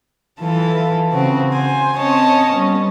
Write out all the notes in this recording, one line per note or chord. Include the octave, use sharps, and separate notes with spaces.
E3 F4 A4
C#3 C4 F#4
C5 G#5
C4 C#4 C#5 D#5 A5
G3 B3 C#4